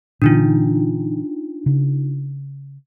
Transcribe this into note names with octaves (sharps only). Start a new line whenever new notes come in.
A#2 D3 E3 D4 D#4 F4
C#3